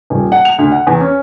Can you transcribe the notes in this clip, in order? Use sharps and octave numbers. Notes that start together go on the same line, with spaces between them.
D#1
F#5
F7
D2
F#5
E2
C#4